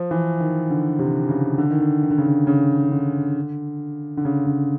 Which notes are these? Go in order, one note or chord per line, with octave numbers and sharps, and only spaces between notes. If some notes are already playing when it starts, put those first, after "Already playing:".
Already playing: F3
E3
D#3
D3
C3
C#3
D3
D#3
D3
D#3
D3
C#3
D3
C#3
D3
D3
C#3
C#3